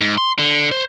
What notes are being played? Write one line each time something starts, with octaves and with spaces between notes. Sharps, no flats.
G#2
C6
D3
C5